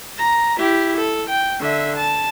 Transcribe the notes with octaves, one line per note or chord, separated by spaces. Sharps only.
A#5
E4 G4
A4
G5
D3 E5
A5